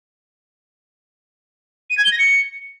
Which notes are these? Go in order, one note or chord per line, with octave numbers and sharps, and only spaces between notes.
D#7
G#6
G7
A#6
C#7